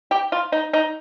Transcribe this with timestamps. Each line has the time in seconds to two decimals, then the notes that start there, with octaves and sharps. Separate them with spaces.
0.11 G4
0.32 F4
0.52 D#4
0.73 D#4